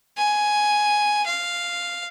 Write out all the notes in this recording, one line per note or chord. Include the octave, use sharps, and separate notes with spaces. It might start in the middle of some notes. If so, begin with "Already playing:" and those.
G#5
F5